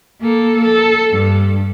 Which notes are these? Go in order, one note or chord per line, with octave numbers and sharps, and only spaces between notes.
A#3 A4
A4
G2